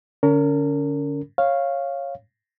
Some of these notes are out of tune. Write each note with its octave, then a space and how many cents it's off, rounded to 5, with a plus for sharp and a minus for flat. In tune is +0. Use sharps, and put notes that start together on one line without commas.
D3 -5 C#4 +35 A#4 -30
C#5 -10 F5 -5